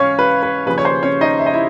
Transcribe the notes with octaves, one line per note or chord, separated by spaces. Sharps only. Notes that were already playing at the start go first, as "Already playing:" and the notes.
Already playing: G#2 E3 C#4 C#5 F5
B4
B4
D#2 C#3 F3 B4
C#5
C5
C#4 C#5
D#4 D#5
E5
D#5
E4 E5